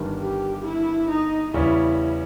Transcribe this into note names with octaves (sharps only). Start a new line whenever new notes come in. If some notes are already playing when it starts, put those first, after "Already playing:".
Already playing: G1 G2 D#3 G3
G4
E4
D#4
E2 C#3 G3 C#4 E4